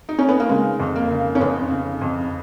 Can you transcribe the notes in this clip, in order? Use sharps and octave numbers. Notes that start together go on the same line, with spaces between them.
D#4
C#4
B3
A#3
C#3 G#3
F2
A#3
C#3
C#4
F2 B3
C#3
F2